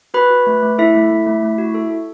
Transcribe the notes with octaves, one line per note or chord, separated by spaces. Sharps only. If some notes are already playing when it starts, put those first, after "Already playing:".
F#4 B4 B5
F#4
A3
A3
E4 A4 E5
A3
A3
A3
A3
F#4
A4
A4